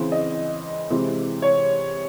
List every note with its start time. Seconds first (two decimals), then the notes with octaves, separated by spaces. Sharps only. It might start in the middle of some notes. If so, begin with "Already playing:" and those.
Already playing: C#3 E3 C4
0.12 D#5
0.90 C3 E3 G#3 C4
1.42 C#5